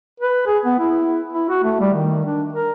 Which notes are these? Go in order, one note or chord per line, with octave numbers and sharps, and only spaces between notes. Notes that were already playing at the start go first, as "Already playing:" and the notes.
B4
G#4
B3
E4
E4
F#4
A3
G3
D#3
D4
A#4